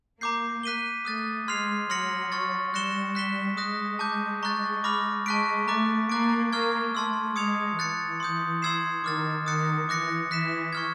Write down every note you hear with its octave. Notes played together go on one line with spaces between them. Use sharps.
A#3 A#5 D6 G6 C7
F#6 B6 D#7 G7
A3 D#6 F#6 A6
G#3 C6 F6 G#6 C7 F7
F#3 C6 F6 A#6 C#7 F#7
C#6 F6 A6
G3 F#6 A#6 C#7 E7 G7
F#6 B6 E7 G7
G#3 D#6 F#6 A#6
A5 D6 G6
A#5 C#6 F#6 A6
B5 D6 F6 A#6
G#3 A5 C#6 F#6 B6 D7
A3 A#5 D6 F#6 A6
A#3 D6 F#6 A6 D7
A#3 C#6 F6 G#6
A3 A5 C6 E6
G#3 D#6 G#6 C#7 F7
E3 F#6 A6 C#7
C6 D#6 G6
C6 E6 G#6 C7 E7
D#3 D6 F6 A6
D#3 D#6 F#6 A6 C#7
E3 D6 F#6 A#6 C#7
E3 F#6 B6 E7
C#6 F6 G#6